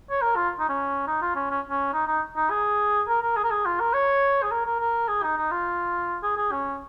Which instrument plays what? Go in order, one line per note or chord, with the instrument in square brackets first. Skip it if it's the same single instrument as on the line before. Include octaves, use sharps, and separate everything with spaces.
[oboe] C#5
A#4
F4
D#4
C#4
D#4
F4
C#4
C#4
C#4
D#4
D#4
D#4
G#4
A#4
A#4
G#4
A#4
G#4
F4
A#4
C#5
G#4
A#4
A#4
A#4
G#4
D#4
D#4
F4
G#4
G#4
C#4